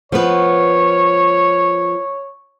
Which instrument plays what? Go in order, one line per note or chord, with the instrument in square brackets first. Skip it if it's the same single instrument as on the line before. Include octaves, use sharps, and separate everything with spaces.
[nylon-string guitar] F3 B3 B4 [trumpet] C#5